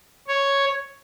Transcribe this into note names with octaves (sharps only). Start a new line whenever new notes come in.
C#5